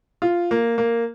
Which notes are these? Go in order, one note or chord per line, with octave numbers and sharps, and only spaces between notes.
F4
A#3
A#3